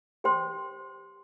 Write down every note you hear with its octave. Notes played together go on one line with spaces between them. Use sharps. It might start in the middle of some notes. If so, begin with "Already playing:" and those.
G4 C5 G5 C6